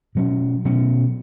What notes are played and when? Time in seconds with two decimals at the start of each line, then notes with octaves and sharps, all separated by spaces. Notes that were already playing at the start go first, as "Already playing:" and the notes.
0.15 B2 F#3 C#4
0.65 B2 F#3 C#4